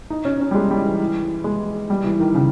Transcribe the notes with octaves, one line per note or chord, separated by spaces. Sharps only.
D#4
C#4
C#4
G3
G#3
G3
E3
G#3
G3
E3
D#3
C#3